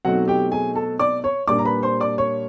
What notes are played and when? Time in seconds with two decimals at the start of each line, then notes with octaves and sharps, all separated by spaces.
0.05 B2 F#3 A3 C4 D#4 F#4 F#5
0.28 G4 G5
0.52 G#4 G#5
0.75 A4 A5
0.99 D5 D6
1.24 C#5 C#6
1.48 A#2 G3 A#3 D4 D5 D6
1.59 A#5
1.65 B4 B5
1.83 C5 C6
2.00 D5 D6
2.18 C#5 C#6